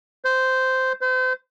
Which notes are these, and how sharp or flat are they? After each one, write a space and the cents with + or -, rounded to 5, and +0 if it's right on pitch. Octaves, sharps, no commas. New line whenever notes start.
C5 -10
C5 -35